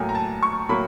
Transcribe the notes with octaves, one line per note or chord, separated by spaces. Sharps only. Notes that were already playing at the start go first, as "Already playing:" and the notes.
Already playing: A2 F#3 A#3 G#5
A#5
A5
C#6
A2 F#3 A#3 B5